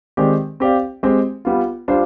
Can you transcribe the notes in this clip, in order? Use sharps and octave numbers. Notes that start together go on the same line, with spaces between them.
D#3 G#3 C4 G4 D5
C4 G4 D5 F5
G#3 C4 G4
G3 B3 F4
G3 D4 F4 C5